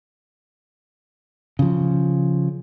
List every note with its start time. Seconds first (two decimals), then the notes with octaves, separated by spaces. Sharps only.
1.59 C#3 F3